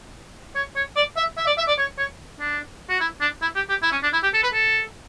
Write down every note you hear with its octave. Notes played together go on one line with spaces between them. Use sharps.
C#5
C#5
D5
E5
E5
D5
E5
D5
C#5
C#5
D4
F#4
E4
D4
E4
G4
G4
E4
C#4
D4
E4
G4
A4
B4
A4